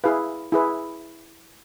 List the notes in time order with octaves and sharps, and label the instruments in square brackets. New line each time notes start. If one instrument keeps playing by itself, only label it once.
[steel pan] E4 G#4 B4 F5
E4 G#4 B4